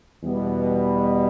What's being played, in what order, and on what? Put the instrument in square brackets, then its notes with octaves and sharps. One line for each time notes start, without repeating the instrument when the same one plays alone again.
[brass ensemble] E2 B2 G3 B3